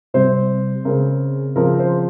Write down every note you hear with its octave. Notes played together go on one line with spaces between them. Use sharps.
C3 G3 C4 C5
C#3 G#3 C4 A#4
C#3 F3 C4 A#4
C5